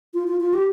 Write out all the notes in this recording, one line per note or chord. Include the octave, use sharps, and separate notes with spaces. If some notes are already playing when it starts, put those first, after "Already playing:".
F4
F4
F4
G4